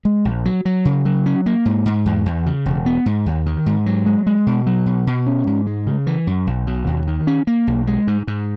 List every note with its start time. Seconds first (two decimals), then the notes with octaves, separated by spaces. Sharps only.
0.05 G#3
0.25 A#1
0.45 F#3
0.65 F#3
0.85 C#3
1.05 F#3
1.26 C#4
1.46 A#3
1.66 G#2
1.86 G#2
2.06 E2
2.26 E2
2.46 C#3
2.66 E1
2.86 B3
3.06 G#2
3.26 D#2
3.46 D#3
3.66 G#2
3.86 F#3
4.06 G#3
4.26 G#3
4.47 B2
4.66 F#3
4.86 B2
5.07 B2
5.26 C#4
5.47 G#2
5.67 G#3
5.87 C#3
6.07 E3
6.27 F#2
6.47 B1
6.67 B2
6.87 D#2
7.07 D#3
7.27 C#4
7.47 A#3
7.67 B1
7.87 G#3
8.07 G#2
8.27 G#2